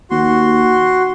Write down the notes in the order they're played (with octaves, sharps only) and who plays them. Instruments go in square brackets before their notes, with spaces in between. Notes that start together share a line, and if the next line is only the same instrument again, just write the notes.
[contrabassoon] D#2 [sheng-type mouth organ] F#4 C6